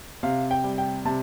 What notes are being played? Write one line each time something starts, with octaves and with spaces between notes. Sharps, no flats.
C3 F5
G5
G3
G5
C3 A5